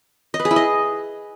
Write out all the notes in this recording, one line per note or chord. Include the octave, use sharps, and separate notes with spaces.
D#5
B4
G#4
E4
D#5